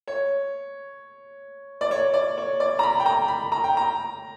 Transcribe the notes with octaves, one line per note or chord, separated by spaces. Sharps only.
C#5
D5
C#5
D5
C#5
D5
A#5
B5
G5
A#5
B5
A#5
G5
A#5